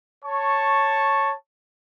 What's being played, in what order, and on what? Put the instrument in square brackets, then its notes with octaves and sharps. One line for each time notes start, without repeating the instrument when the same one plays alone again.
[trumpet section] C#5 A5 C#6